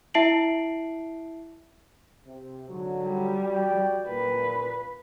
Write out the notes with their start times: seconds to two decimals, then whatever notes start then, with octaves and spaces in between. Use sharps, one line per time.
0.14 E4 E5 A5 C7 D7 F#7
2.27 C3
2.69 G#2 D3 F#3
3.05 G3
3.45 F#4 D5 G5
4.08 A#2 B4